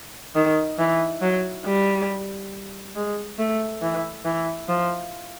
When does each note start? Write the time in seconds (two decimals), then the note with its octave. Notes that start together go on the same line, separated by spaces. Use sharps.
0.35 D#3
0.79 E3
1.22 F#3
1.65 G3
2.96 G#3
3.39 A3
3.82 E3
4.25 E3
4.68 F3